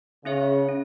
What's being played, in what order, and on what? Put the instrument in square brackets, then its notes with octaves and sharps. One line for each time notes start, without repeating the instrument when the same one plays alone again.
[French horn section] C#3 [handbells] C#4 G#4 C#5 E5
[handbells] C#4